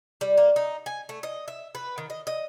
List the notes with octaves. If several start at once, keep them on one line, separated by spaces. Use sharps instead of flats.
G3
A#3
D#4
G#5
A3
D#5
E5
B4
D#3
D#5
D#5